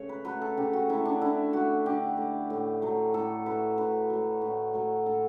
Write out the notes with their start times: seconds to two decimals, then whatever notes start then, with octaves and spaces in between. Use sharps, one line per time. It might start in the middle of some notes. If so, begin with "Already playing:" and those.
Already playing: C#3 A3 C#5
0.09 B4
0.25 F#3 A3 B4
0.42 A4
0.57 C#3 G4
0.73 F#4
0.89 F#3 A3 E4
1.05 D4
1.21 D3 E4
1.53 A3 F#4
1.86 D3 G4
2.17 A3
2.50 A2
2.82 F#3 A3
3.14 A2 A4
3.46 F#3 A3 B4
3.78 A2 B4
4.10 F#3 A3
4.41 A2
4.74 F#3 A3
5.06 A2 A4